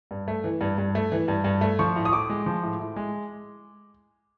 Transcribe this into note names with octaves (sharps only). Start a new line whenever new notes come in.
G2
A3
E3
G2
G2
A3
E3
G2
G2
A3
F3 C#6
A2
D#6
A2 D6
G#3
F3
A2
A2
G#3